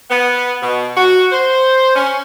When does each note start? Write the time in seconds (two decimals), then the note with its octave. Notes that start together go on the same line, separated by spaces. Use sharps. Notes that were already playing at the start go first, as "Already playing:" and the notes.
0.09 B3
0.61 B2
0.95 F#4
1.32 C5
1.95 C#4